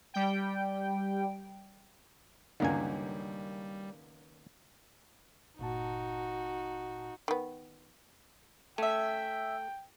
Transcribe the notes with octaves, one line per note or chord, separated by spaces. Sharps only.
G3 G5
C#2 F#2 D3 D#3 G3 A#3 G#5
G1 A#2 D#4 F#4 A5
D#3 B3
A3 C#4 E5 G5